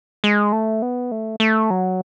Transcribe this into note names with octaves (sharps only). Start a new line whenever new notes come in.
G#3
A3
B3
A3
A3
F#3